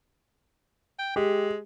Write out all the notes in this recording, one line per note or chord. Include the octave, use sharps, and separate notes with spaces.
G5
G#3 G4